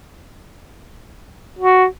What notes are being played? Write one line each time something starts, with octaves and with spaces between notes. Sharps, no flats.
F#4